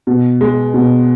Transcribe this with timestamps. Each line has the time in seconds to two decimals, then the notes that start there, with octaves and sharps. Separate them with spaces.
0.07 B2
0.41 G#3
0.74 B2